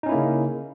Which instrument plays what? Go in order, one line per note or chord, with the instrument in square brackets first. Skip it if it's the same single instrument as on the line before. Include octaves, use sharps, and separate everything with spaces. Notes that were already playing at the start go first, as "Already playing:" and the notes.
[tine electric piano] D#4
C#4
E4
A#3
C#3